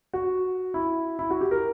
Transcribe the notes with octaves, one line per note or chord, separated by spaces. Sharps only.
F#4
E4
E4
F#4
G4
A#4